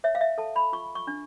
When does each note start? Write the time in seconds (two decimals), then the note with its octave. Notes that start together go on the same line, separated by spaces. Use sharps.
0.04 C#5 E5
0.15 F5
0.21 E5
0.38 A4 A5
0.56 B5
0.73 F4 C#6
0.95 C#6
1.07 D4